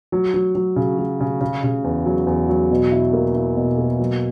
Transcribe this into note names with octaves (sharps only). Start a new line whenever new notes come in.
F#3
F#3
F#3
C#3
F#3
C#3
C#3
C#3
E2
F#3
E2
F#3
B2
E4
A#3
E4
B2
A#3
F#3